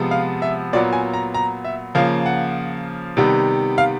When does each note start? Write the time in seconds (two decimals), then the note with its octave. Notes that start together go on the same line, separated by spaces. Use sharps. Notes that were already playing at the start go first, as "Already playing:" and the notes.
Already playing: C3 F3 G#3 B3
0.11 F5
0.42 E5
0.73 A#2 F#3 B3 D5
0.93 G#5
1.13 A#5
1.34 A#5
1.65 E5
1.95 C#3 F3 A#3 F5
2.26 F#5
3.17 C3 D#3 G3 B3
3.78 F5